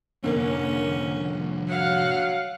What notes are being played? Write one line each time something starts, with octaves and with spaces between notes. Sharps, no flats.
C2 F2 D3 A#3 C#4
F#3 F5 F#5